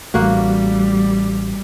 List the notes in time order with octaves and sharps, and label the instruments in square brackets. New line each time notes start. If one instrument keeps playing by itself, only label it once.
[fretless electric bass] A1 A3 [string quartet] G3 [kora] A#3 F#4